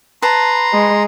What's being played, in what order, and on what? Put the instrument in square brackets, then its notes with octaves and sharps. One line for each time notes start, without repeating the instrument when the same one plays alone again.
[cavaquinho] B4 A5 [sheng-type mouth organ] A#5 C6
[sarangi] G#3